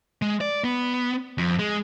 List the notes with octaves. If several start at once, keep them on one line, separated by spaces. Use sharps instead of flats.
G#3
D5
B3
F2
G#3